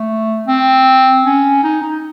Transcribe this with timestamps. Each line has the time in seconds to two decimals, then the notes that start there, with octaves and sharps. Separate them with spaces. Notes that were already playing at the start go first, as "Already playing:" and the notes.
Already playing: A3
0.47 C4
1.25 C#4
1.63 D#4
1.82 D#4